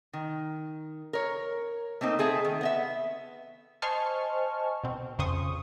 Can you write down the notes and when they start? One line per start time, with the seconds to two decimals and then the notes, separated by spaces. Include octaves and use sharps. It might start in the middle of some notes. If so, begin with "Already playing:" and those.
0.13 D#3
1.13 A#4 C#5
2.01 A3 A#3 C4 D#4
2.19 C4 G#4 A4 E5
2.45 D#3
2.61 B3 D#5 E5
3.82 C5 D#5 G#5 A5 C#6 F6
4.84 B2 C4
5.19 F2 C#3 C5 C#6 D#6